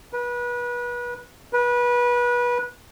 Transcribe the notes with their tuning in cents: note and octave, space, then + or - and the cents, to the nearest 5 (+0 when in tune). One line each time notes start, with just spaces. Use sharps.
B4 -30
B4 -25